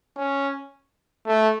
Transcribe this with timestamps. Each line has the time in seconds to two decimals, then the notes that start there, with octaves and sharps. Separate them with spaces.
0.17 C#4
1.27 A3